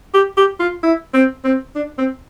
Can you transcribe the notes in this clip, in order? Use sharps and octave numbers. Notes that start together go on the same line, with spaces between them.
G4
G4
F4
E4
C4
C4
D4
C4